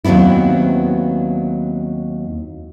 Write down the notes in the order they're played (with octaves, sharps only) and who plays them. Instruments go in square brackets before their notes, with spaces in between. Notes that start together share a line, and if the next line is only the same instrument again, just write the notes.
[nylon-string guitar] D#2 F#3 B3 C4 E4